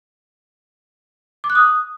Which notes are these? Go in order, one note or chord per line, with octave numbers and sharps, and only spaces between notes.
D6
F#6
D#6